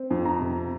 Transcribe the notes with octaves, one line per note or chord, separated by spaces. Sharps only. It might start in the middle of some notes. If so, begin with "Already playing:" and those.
Already playing: C4
F2
A#5
C3